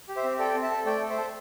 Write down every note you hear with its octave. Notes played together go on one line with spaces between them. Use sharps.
G4
C5 E5
C4
A4 D5 G5
C4
E5 A5
A4
A3 D5 G5
A4
C5 E5
A4